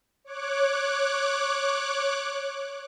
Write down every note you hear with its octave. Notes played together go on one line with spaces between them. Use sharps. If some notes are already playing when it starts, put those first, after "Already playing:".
C#5 D6 F#6